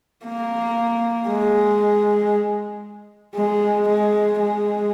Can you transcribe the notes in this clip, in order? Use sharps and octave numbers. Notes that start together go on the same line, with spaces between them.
A#3
G#3
G#3
G#3
G#3